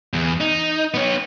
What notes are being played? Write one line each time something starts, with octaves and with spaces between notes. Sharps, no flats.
E2
D#4
B3 C#5